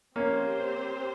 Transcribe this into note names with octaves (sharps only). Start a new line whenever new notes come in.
A#3 C4 C#4 G4 C5